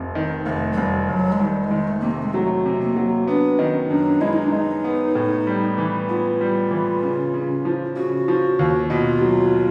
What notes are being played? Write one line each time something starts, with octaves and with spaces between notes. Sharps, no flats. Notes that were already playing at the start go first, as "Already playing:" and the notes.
Already playing: F1 C3
D#3
F1 A3
F#3
F1 G3
F1 F#3
G#3
D#3 G3
G#3
D#3
A3
C3 A#3
A3
G#3
F#3 A3
C3
A#3
F#3
B3 D4
D#3 C#4
F#2 D4
G#3 E4
D#4
D4
G#3 D#4
B3
A2
G3
E3
B3 F4
G3
E3
C#3
C#3
F3
C#3 F#4
F3
D#2
B2 F4
F#3